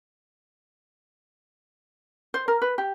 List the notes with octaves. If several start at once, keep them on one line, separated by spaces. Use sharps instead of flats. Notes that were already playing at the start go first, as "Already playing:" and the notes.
C5
A#4
B4
G4